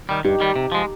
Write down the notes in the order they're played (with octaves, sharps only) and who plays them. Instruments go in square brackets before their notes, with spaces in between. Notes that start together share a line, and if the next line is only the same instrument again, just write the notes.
[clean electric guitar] D#3 G3
[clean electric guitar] G2 [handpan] D#4 G4
[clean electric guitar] D#3 G3
C3
F3 G#3